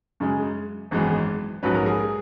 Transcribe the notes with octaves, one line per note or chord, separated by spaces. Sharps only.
F#2 C#3 G#3
G#1 F#2 E3 G#3 B3
A#1 G#2 F#3 C#4 B4
A#4
G#4